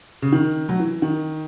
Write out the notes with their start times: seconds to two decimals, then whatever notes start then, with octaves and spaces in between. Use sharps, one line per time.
0.22 C#3
0.32 D#3
0.69 F#3
0.80 E3
1.02 D#3